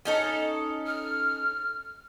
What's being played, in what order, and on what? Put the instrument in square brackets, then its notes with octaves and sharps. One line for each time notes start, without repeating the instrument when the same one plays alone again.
[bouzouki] C#4 D#4 A4
[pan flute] F6